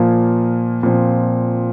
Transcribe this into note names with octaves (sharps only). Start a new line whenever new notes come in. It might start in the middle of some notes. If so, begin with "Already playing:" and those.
Already playing: A#2 F3 A#3
A#2 F3 C4